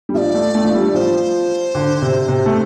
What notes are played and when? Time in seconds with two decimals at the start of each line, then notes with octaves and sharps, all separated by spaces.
0.09 G3
0.14 F3 D5 E5
0.34 A3
0.55 A3
0.65 F3
0.75 G3
0.94 F3 C5
1.75 D3
2.02 C3
2.28 C3
2.46 A3